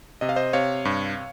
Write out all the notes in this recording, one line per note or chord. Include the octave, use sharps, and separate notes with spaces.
C3 D#5
F5
C5 D#5
C3 C#5 F5
G2